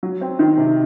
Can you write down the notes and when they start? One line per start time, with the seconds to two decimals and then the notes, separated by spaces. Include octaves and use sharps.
0.03 F#3
0.21 C4
0.39 D#3
0.58 C3